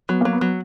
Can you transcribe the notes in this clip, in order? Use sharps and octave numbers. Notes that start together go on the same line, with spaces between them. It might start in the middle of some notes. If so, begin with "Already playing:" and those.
F#3 B3
F#3 A#3
B3
F#3